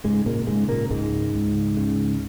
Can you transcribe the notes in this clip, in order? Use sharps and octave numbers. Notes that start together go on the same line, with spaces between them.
G#2 C#3 G#3
A#2 A#3
G#2 C#3 G#3
A#2 A#3
C#2 G#2 G#3
C#2
C#3